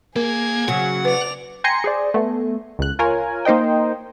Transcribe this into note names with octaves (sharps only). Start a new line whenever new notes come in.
A#3 G#4 A#4 G#6
C#3 F#3 F#5
B4 D5 F7
G5 G#5 A#5 C6 A#6 C#7
G#4 C5 D5
A3 B3
C#2 F#6
F4 A#4 C#5 G#5
A#3 D#4 C5 D#5 G5